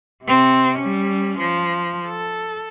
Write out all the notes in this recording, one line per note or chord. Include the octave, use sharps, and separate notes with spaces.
C3 C4
G3 C#4
F3
A4